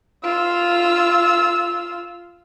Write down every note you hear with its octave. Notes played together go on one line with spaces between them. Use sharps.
F4 E6